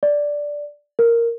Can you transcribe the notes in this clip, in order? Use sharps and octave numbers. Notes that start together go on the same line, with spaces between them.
D5
A#4